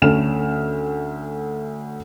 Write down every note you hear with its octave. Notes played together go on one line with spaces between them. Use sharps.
D2 A3 C#4 A4 F6 E7